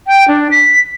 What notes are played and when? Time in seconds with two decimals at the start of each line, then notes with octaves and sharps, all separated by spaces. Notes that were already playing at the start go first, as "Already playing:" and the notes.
0.07 G5
0.28 D4
0.51 B6